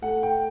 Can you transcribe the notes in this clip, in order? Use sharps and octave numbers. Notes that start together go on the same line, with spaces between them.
A3 F#5
G5